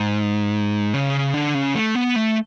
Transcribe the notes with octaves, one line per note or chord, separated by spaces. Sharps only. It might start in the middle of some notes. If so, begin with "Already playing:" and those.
Already playing: G#2
C#3
D3
C#3
A3
B3
A3